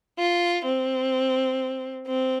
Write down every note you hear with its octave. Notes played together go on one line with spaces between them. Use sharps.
F4
C4
C4